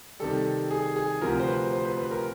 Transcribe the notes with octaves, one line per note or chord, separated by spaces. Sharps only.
C3 D#3 G3 A4
G#4
G#4
D2 C3 F3 A#4
C5
B4
C5
B4
B4
A#4